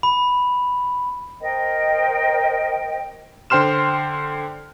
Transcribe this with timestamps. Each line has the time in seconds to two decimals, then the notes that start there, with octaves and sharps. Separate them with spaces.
0.03 B5
1.41 A#4 C5 D#5 G5
3.50 D3 C5 G5 C6 F6 E7